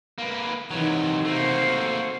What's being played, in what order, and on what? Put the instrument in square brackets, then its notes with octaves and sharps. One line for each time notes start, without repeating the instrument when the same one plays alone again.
[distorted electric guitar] A#3 B4
[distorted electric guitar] C3 F#3 [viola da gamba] D#3 E3
[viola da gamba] C3 F#4 C5 [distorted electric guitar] A3 A#3